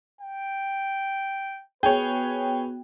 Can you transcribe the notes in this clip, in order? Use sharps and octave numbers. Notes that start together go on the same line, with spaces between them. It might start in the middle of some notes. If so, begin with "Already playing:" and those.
G5
B3 F#4 G#4 B4 C#5 G5